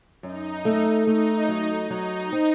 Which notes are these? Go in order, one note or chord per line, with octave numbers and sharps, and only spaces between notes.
F#2 D#4
A3
A3 D#4
F#3
F#3 D#4
C4